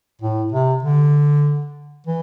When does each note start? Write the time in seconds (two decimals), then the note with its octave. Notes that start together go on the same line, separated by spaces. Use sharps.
0.22 A2
0.52 C3
0.83 D3
2.07 E3